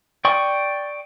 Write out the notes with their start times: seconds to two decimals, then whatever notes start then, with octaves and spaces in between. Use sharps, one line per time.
0.25 D5 G5 C#6 D#6